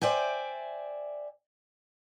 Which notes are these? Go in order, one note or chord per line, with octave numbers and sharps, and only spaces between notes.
C5 D5 E5 G5 G#5